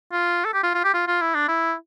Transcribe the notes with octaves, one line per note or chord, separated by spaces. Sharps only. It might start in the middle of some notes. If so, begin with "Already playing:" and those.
F4
A4
G4
F4
F4
G4
F4
F4
E4
D4
E4